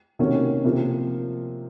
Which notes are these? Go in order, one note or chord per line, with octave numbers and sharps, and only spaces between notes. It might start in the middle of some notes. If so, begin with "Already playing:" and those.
C3 D#3 A#3 C#4 F#4
C3 F3 A#3